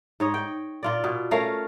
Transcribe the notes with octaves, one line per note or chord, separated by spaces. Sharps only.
G#2 C#5 D#5
G5
A#2 F4 D5
B2
A3 C#4 A#4 F5